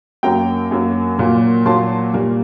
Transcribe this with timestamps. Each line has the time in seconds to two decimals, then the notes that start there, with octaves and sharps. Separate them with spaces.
0.23 F#2 F#3 A#3 G5 A#5
0.71 F#2 F#3 A#3
1.18 A#2 F#3 A#3
1.66 A#2 F#3 A#3 A5 C6
2.13 A#2 G3 A#3